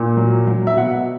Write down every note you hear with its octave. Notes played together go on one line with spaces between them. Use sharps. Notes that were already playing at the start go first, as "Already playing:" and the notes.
Already playing: A#2
F#3
F#3
E5
B2 F#5